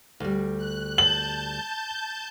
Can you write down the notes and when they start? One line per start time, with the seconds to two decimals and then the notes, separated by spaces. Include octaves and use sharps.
0.20 D2 G3
0.58 F#6
0.98 A5 G6 F#7